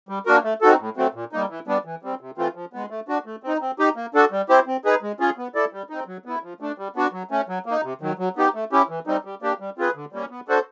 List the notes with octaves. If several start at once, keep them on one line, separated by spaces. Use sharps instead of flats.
G3
A#3 D4 F#4 A#4
A3
C4 D#4 F#4 A4
A2
F#3 A3 C4
A#2
G3 A#3 D#4
E3
G3 B3 D4
E3
G3 C4
C3
E3 A3 C4 F4
F3
G#3 B3
A3
D4 F#4
A3
C4 D#4
C4
D#4 G4
A#3
D4 F#4 A4
G3
C4 E4 G4 C5
C4
D#4 G#4 B4
G#3
C#4 F4 G#4
B3
E4 A4 D5
G3
C4 D#4
F#3
B3 E4
F3
A3 D4
G3
B3 D4 F#4
F#3
A3 C#4
F#3
A#3
D#4
C3
D#3 F#3
F#3
B3 D#4 G4
A3
C#4 E4 G4
E3
G3 C4 D#4
G3
A#3 D4 G4
G3
C4 F4 G#4 B4
D3
G3 A#3 C#4
B3
D4 F#4 A4 C5